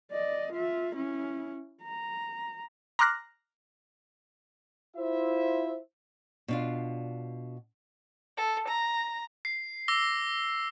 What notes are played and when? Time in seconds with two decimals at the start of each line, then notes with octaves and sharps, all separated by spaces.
0.12 D5 D#5
0.52 F4 E5
0.95 C#4 E4
1.83 A#5
2.99 A#5 C6 D6 F6 F#6 A#6
4.97 E4 F4 C5 E5
6.48 B2 D4 F4
8.37 A4
8.68 A#5
9.45 C7
9.88 D6 E6 A#6 G7